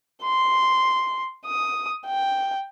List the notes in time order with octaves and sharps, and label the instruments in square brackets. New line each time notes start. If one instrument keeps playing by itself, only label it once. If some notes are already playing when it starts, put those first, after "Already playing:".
[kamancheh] C6
D#6
G5